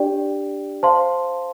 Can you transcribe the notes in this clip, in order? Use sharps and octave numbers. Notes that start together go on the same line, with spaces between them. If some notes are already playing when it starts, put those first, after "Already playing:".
Already playing: D4 G4 D5 G5
C5 F5 A5 C6